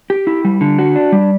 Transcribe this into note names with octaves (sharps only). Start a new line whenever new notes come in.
G4
E4
G3
D3
F#4
D4
G3